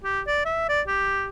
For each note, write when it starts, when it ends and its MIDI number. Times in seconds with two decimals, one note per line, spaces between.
0.04 0.21 67
0.27 0.41 74
0.45 0.68 76
0.69 0.82 74
0.87 1.29 67